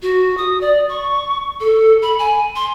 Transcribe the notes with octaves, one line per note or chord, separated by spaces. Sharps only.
F#4
D#6
D5
C#6
A4
B5
G#5
C6